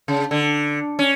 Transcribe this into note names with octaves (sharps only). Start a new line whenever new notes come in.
C#3
D3
C#4